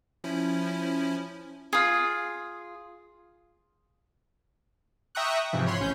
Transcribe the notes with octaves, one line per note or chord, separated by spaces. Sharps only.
F3 C#4 E4
F4 G#4
E5 G5 A#5 C#6 D#6 F#6
G#2 C3 E3 F3
C#5 B5 C6
A1 C#4 G6